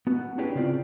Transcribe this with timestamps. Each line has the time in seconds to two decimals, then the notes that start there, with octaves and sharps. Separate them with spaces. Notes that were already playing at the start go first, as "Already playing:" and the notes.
0.07 B3 F#4
0.38 C#4 D4 E4 G4 G#4 B4
0.55 C#3 C4 F4 D5